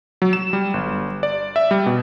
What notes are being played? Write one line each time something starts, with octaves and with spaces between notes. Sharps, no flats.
F#3
E7
G3
G1
D5
E5
G3
B2